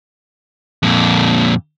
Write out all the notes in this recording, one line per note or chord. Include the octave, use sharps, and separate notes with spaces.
F2 A#2